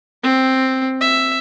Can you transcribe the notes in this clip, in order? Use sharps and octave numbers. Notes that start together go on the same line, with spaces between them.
C4
E5